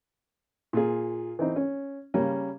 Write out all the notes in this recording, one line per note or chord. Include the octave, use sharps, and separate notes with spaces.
A#2 F4 G#4
E3 C4 D#4
C#4
C#3 G3 A#3 C#4